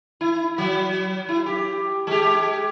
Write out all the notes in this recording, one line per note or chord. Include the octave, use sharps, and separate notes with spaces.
E4
F#3
E4
G4
G#3 G4